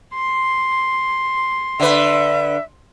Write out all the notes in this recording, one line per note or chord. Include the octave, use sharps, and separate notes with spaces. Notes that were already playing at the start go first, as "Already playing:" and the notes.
C6
D3 B4 E5